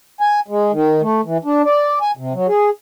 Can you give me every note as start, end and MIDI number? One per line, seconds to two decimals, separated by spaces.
0.21 0.40 80
0.48 0.72 56
0.72 1.01 51
1.02 1.21 57
1.25 1.38 52
1.45 1.62 62
1.65 1.99 74
2.01 2.11 80
2.17 2.33 48
2.34 2.47 54
2.48 2.70 68